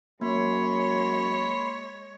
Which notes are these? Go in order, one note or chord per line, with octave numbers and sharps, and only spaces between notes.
F#2 G#3 A#3 C#5 B5 C6